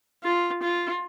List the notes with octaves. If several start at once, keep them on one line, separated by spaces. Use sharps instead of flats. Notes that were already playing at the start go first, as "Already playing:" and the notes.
F4
F4